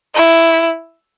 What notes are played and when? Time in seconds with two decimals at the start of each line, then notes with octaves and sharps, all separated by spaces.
0.16 E4